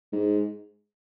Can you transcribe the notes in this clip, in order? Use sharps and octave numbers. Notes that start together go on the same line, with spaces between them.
G#2